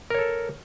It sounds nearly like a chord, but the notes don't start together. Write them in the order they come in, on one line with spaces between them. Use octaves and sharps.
A#4 C#5 A4